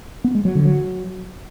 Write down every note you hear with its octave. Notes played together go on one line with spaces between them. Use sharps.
B3
G#3
F#3
D3
F#3